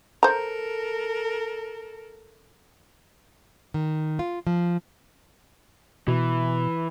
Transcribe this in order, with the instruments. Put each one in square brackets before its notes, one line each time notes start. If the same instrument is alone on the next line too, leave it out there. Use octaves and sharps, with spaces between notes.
[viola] A4 A#4 [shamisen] C5 A#5
[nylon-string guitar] D#3
F4
F3
[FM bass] B2 [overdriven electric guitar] E3